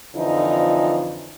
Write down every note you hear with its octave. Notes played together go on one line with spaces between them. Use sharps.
F2 D3 E3 F3 D#4